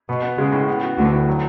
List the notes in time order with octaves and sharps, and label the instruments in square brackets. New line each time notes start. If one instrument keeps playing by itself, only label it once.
[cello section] B2 [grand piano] B3
[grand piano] B3
[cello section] C#3 [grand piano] G#3
[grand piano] A2
B3
F#4
[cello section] D2 D3 [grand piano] F#4
[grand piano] A2
F#3